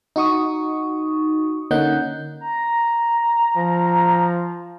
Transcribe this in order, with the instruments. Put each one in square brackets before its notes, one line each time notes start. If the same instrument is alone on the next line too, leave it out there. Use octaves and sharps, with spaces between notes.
[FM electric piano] D#4 F#4 C#6 D#6
D3 A#3 C#4 D#4 F#5 G6
[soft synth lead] A#5
[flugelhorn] F3